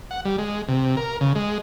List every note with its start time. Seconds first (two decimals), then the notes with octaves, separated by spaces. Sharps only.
0.11 F#5
0.25 G3
0.38 G#3
0.68 C3
0.97 A#4
1.21 C#3
1.35 G#3